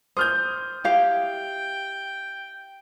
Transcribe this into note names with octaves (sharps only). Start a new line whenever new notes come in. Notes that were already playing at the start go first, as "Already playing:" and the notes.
C5 D#6 F6 G6
E4 G4 F5 G5